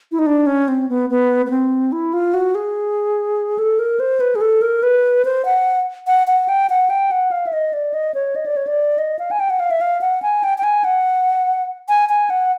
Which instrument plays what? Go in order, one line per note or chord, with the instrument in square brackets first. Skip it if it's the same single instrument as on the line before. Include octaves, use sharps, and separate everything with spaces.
[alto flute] E4
D#4
D4
C#4
C4
B3
B3
B3
C4
E4
F4
F#4
G#4
A4
A#4
C5
B4
G#4
A4
A#4
B4
C5
F#5
F#5
F#5
G5
F#5
G5
F#5
F5
E5
D#5
D5
D#5
C#5
D#5
D5
C#5
D5
D#5
F5
G#5
G5
F#5
F5
E5
F5
F#5
G#5
G5
G5
G#5
F#5
G#5
G#5
F#5